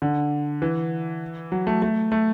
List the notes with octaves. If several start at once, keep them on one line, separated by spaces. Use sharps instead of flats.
D3
E3
F#3
A3
A3
A3